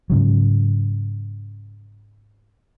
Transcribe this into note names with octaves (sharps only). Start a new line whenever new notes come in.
G#2 C#3 F#3